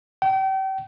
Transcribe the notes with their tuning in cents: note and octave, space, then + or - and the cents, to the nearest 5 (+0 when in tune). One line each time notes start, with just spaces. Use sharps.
G5 -35